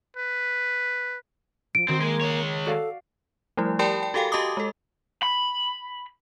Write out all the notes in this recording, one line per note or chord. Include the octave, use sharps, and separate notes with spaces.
B4
F3 D7
D#3 C4 F#4
G#3 A#3
G#3 C#5
F#4 A4 D5 F5
F3 G3 A3 E4
G4 A#4 D5 G5 A5 B5
G5
F#4 G4 A4 F5 G5 G#5
F#4 G4 D#5 A5 D6 D#6
G#3 A4
B5